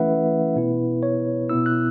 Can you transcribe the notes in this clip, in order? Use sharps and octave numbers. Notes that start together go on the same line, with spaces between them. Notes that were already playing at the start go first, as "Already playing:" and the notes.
Already playing: E3 A3 C#4 E4 B4 E5 F#5
B2 B3 E4
C#5
B2 B3 E4 E6
F#6